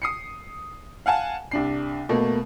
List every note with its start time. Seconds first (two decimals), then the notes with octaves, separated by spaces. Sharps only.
0.02 D#6 C7 C#7
1.06 F5 F#5 G#5 A5
1.51 C2 D4 C7
2.09 B2 A3 A#3